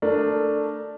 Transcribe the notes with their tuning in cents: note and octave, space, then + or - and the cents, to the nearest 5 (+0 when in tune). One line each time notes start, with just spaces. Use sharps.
A3 +10 D4 +0 A#4 +0